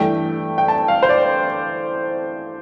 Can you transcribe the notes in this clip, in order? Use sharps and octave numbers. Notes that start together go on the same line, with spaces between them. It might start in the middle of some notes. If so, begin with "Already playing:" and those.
Already playing: G2 E3 A3 G5
G5
A5
F5
C5
D5